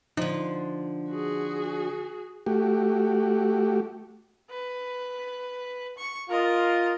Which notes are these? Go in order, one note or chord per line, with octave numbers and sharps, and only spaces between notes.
D3 F3 D#4
F#4 G#4
A3 F#4 G4
B4
C#6
F4 A#4 D#5